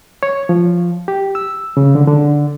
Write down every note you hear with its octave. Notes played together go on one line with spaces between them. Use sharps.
C#5
F3
G4
E6
C#3
D3
D3